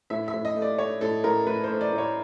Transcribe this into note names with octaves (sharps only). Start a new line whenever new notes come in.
A2 E5
E5
A2
D#5
A3
D5
A3 C#5
A2 A4
A2 A#4
A2 B4
C5
A3
D5
A2
C#5